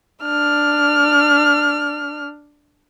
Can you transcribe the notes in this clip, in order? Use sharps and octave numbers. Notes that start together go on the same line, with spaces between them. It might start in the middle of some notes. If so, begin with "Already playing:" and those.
D4 F6